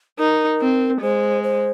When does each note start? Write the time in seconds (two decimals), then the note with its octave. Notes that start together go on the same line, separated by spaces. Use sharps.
0.19 D#4 A#4
0.61 C4
1.01 G#3 C5
1.43 C5